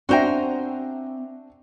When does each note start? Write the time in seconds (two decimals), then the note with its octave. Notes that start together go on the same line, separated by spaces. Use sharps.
0.09 C4 D4 F#4 C5 E5 G5 G#5 A#5